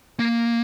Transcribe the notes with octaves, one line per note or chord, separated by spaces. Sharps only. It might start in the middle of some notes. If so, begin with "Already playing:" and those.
A#3